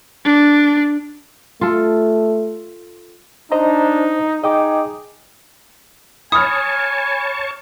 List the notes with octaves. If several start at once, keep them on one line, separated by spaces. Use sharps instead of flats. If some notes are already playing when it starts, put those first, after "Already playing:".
D4
A3 F4 A4
D4 D#4 C5 D#5 A#5
D#4 G#4 D#5 G5 D6
C#5 G#5 A5 B5 C#6 D#6 F6